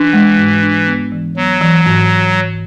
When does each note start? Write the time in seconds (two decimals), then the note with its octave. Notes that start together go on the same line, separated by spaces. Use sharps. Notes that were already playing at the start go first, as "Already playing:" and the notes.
Already playing: E3 D4
0.13 G#3
0.38 G#2
0.62 D4
0.87 B3
1.12 E3
1.37 F#3 B3
1.61 E3
1.86 G#2